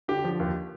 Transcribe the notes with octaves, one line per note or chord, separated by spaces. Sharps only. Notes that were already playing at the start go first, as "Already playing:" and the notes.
D3 G4
F3
D#2